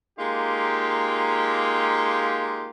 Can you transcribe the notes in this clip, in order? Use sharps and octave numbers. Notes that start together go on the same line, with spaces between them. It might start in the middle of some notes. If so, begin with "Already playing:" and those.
G#3 A#3 D#4 F4 G4